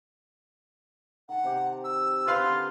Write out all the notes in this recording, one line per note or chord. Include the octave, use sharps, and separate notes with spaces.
D#3 F#5 A5
C3 G4
E6
C4 F4 G4 B4 F5 C6
D3 A#4 F6